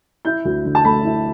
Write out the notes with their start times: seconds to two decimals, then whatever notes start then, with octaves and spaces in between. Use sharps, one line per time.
0.25 E4 G6
0.45 D2
0.65 D3
0.75 A5
0.85 A3 B5
1.05 E4